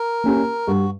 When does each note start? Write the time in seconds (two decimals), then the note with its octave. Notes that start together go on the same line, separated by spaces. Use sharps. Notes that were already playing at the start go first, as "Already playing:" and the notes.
Already playing: A#4
0.24 A#3 C#4 G4
0.67 G2 F#4